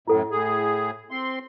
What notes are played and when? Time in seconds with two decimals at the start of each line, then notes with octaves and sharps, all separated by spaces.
0.07 F#2 A2 E4 A4 F#5
0.31 A2 G#4
1.11 C4 C6